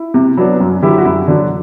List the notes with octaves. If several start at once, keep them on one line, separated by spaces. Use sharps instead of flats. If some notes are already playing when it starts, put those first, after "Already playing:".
Already playing: E4
C3
F#3 B3 D4
F#2
D3 F#3 E4 G4
F#4
F#2 E4
E4
D3 F#3 D4